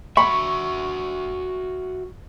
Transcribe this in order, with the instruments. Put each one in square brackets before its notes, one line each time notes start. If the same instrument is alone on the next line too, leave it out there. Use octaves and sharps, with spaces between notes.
[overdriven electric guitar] F#4 E5 [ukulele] B5 [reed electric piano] C#6